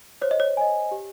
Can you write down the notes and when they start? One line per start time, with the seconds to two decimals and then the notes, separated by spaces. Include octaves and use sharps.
0.22 C5 C#5
0.31 D#5
0.40 C#5
0.57 D#5 G#5
0.91 G4